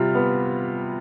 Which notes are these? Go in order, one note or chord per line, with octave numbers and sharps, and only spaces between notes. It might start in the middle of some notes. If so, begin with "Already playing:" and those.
Already playing: C3 G3 F4
B3